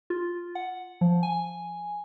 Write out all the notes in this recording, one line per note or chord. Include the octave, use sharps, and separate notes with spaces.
F4
F#5
F3
G#5